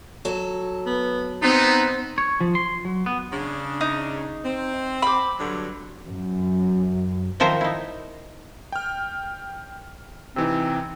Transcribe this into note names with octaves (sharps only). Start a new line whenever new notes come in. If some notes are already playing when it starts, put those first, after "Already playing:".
F#3 A4
B3
B3 C4 D#4
C#5
F3
C6
F#3
B3
C#3 D4
D#4
C4
B5 D6
G2 D3 F#3
F#2
D#3 F3 A#4 C5 E5 A#5
D#4 E4
G5 F6
C3 E3 C4 D#4